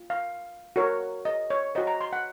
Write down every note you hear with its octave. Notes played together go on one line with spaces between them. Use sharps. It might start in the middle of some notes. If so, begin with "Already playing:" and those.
Already playing: F4
F5
F#4 A#4 C#5
D#5
C#5
F#4 C5 D#5
A#5
C6
F#5